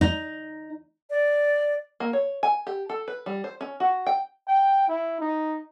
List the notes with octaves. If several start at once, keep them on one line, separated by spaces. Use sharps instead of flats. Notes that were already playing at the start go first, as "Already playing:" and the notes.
D#4
D5
A#3
C#5
G#5
G4
A4
B4
G3
C5
C#4
F#4
G5
G5
E4
D#4